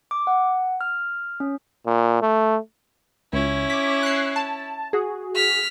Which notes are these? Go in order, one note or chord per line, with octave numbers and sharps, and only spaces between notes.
D6
F#5
F6
C#4
A#2
A3
C#2 C#4 E4
D6 B6
F#6 C7
A5
F#4 G#4
F6 B6